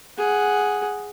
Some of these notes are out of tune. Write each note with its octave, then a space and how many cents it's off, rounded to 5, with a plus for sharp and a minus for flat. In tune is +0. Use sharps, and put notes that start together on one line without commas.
G#4 +0 F#5 +0